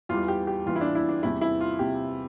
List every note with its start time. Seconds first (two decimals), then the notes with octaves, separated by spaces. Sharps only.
0.09 E2 E3 G3 F4
0.28 G4
0.47 G4
0.66 E2 E3 G3 F4
0.76 E4
0.81 D4
0.95 E4
1.09 D4
1.23 E2 C3 E3 G3 E4
1.41 E4
1.61 F4
1.79 C3 G4